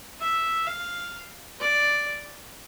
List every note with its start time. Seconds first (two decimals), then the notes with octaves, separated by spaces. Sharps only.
0.21 E5
0.67 F5
1.60 D5